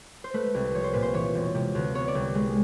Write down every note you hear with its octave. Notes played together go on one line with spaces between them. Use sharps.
C5
A3 B4
C2
F3 C#5
C5
A#2 B4
C5
E3 C#5
E1
C3
D2
B3 C#5
D5
C2
G#3